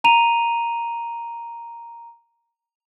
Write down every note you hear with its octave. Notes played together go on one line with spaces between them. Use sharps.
A#5 D#7 F7